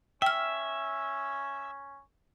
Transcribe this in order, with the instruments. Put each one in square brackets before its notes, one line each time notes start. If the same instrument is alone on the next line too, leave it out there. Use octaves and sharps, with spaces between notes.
[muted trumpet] C#4 [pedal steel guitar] E5 [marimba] G5 F6